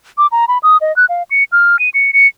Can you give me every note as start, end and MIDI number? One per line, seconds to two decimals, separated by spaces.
0.18 0.27 86
0.32 0.45 82
0.48 0.58 83
0.63 0.77 87
0.81 0.95 75
0.96 1.05 90
1.09 1.23 77
1.31 1.44 97
1.52 1.79 89
1.79 1.89 99
1.94 2.11 97
2.13 2.27 97